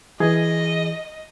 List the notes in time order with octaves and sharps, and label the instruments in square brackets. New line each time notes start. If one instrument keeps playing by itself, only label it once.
[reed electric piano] E3 G#4 [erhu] D#5